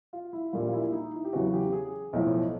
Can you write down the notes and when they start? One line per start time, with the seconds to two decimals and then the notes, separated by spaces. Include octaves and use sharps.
0.13 F4
0.33 E4
0.52 A#1 A#2 G3 F4
0.68 F4
0.73 E4
0.83 E4
0.92 D#4
1.13 E4
1.25 G4
1.33 E2 C#3 F#3 F#4
1.54 G4
1.73 G#4
2.13 B1 A2 F3